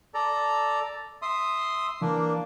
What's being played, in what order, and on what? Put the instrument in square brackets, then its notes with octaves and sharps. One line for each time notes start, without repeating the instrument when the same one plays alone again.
[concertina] A4 D5 A#5
E5 C6 D#6
[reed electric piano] E3 [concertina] A#3 D4